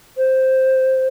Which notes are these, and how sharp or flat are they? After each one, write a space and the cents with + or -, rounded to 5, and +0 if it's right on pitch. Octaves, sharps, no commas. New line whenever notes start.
C5 +0